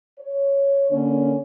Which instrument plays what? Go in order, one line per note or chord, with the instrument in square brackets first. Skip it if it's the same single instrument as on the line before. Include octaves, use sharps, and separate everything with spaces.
[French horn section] C#5
D3 A#3 C#4